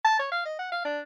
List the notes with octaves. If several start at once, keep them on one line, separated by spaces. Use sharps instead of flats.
A5
C#5
F5
D#5
F#5
F5
D4